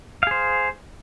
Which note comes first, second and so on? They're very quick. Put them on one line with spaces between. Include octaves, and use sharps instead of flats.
F5 G#4 C5